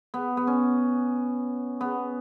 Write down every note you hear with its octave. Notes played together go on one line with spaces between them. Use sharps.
B3
B3
C#4
B3